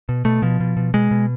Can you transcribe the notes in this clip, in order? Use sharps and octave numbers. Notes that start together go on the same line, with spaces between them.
B2
B2 A3
B2 F3
B2
B2
B2 G#3
B2